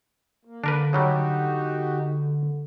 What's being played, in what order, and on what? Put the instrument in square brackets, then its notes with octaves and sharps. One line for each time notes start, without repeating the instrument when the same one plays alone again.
[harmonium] A#3
[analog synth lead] D3 [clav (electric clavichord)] D4 A#4 B4
[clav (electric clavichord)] C#3 F#3 G3 [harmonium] D#4 F#4 G4